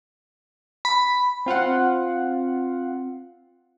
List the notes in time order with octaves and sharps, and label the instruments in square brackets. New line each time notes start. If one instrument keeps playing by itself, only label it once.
[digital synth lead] B5
[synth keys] C4 F4 F5 F#5